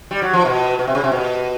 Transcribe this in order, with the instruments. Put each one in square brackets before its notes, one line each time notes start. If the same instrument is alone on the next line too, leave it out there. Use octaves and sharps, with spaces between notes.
[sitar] G3
F#3
F3
B2
B2
C3
C#3
C3
B2